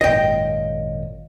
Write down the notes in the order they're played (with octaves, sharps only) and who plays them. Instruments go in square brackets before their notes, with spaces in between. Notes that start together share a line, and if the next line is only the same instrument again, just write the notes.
[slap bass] G#1 F#2 A#2 [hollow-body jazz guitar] D#5 G5